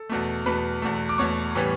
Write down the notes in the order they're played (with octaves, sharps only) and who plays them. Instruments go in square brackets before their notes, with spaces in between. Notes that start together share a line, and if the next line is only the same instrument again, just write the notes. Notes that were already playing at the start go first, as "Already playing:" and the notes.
Already playing: [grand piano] A4
E2 B2 A3
E2 B2 A3 B4 B5
E2 B2 A3
D6
E2 B2 A3 C#5 C#6
A2 E3 G3 B3